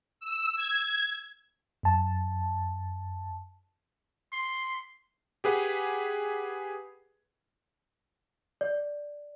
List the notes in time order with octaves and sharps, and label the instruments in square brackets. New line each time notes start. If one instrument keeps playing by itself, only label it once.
[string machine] E6
G#6
[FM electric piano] F#2 A5
[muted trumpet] C6
[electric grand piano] G4 G#4 B4 F#5
[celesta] D5